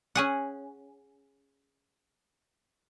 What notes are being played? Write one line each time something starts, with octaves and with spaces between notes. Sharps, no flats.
C#4 G#4 F#5